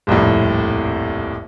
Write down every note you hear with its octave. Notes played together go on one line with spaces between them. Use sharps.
D#1 C2 F2 A2